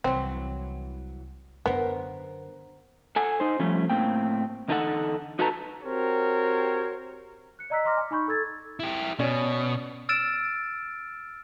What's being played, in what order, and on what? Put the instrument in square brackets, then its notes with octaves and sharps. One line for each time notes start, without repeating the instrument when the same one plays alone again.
[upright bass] C2 [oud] E3 F#3 [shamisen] C4
[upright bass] F#2 D3 [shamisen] B3 [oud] A#4 C5
[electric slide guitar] A4 F#5 G#5
D#4 C5
F3 G3 A3 C#4
A2 A#3 C4 G5
E2 D3 D#4 E4 A4 F#5
D#4 F#4 A4 B4 A5 A#5
[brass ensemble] C4 F#4 G4 A#4 C5 C#5
[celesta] F#6 C#7
D5 D#5 A#5 E6 F#6 B6
D#5 A#5 C6 D6 F6 A#6
G#5
D#4 G#5 B5 C#6 G6
A4 E6 G#6 A6
[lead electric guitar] E4 G4
[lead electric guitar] B2 [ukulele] C#4 D5
[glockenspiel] E6 F6 A6 D7 E7